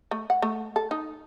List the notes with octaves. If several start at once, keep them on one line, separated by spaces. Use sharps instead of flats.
A3
F#5
A3
A4
D#4